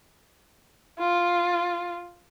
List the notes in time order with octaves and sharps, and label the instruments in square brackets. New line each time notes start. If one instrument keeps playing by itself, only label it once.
[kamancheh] F4